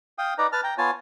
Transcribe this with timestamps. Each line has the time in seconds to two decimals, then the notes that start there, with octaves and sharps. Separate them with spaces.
0.18 F5 G5 D#6
0.38 D#4 B4 D5 A#5
0.52 B4 A5 F6
0.64 G5 A#5
0.78 B3 F4 C#5 G#5 A5